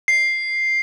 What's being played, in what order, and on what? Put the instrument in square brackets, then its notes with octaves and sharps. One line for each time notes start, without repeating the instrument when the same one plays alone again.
[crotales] C7